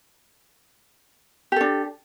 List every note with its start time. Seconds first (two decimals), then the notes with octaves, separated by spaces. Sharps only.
1.52 G4
1.56 A4
1.61 D4